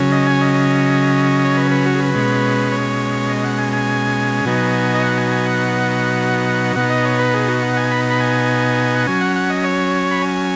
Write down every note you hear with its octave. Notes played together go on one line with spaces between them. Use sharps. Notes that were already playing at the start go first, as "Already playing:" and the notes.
Already playing: C#3 F#3 C#4
D#5
G#5
D#5
C#5
B4
B4
F#4
G#4
B4
B2 G#3 C#4
C#5
D#5
F#5
G#5
G#5
B2 F#3 B3 D#4
D#5
F#5
G#5
G#5
F#5
B2 B3 D#4 F#5
D#5
C#5
B4
G#4
F#4
F#5
G#5
B5
B5
G#5
F#5
F#3 C#4 G#5
F#5
F#5
D#5
C#5
B5
G#5